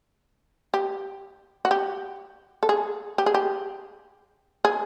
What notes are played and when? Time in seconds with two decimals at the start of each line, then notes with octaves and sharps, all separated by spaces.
0.74 G4
1.65 F#4
1.71 G4
2.63 A4
2.69 G#4
3.18 G4
3.26 G#4
3.34 G4
4.65 G#4